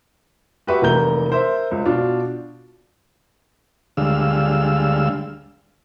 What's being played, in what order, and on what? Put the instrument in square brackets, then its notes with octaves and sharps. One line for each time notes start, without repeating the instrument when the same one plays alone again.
[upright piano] F#4 G4 B4 E5 F#5 C#6
F1 E3 A#3 A#5 G6 G7
A#4 C5 E5
C#2
B2 D4 F4
[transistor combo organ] D2 D3 G3 G#3 F5 E6